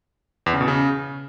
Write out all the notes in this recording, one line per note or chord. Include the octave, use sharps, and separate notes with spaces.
E2
C#3
B2
C#3